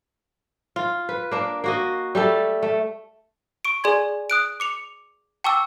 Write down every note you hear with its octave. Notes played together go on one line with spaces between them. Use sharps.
F4
B4
A#3 D4
A#3 F#4 D#5
G3 A3 A4
A3
C#6 D7
G#4 D5 G#5 C6 G#6
D#6 F#6 D7
D6 C#7 F7
G5 A5 C#6 D6 E6